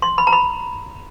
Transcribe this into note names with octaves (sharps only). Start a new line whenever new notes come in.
C6
B5
A#5
B5